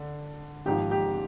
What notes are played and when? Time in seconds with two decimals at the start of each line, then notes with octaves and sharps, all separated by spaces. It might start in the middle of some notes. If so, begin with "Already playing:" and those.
Already playing: D3
0.66 G#1 G#2 F3 G4
0.91 G4